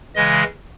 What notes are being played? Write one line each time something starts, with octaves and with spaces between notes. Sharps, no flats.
C#3 E3 G#3 D#5